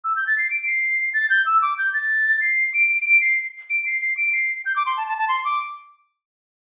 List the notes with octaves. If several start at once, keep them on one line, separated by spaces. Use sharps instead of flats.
E6
G6
A6
C7
D7
C7
A6
G6
E6
D6
G6
A6
C7
D7
D7
D7
C7
D7
C7
C7
D7
C7
G6
D6
C6
A5
A5
A5
C6
D6